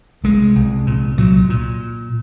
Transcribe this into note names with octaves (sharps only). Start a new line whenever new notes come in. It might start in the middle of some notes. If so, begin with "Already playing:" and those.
C2 G#3
C2
A#2
A#2 F#3
A#2